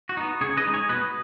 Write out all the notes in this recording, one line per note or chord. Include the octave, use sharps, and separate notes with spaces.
F#4
B3 D#4
C#3 G#4 C#5
B4 D#5
G#3 D#4
G#4 C#5
B2 B4 D#5